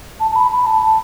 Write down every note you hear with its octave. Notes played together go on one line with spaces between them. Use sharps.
A5
A5
B5
B5
A5
A5